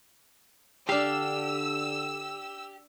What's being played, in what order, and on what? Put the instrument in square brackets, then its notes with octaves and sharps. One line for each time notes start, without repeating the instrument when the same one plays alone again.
[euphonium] D3 [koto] D4 F5 [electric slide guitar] G4 [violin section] E6